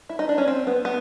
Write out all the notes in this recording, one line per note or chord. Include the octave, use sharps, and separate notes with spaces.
E4
D#4
D4
C#4
C4
B3
B3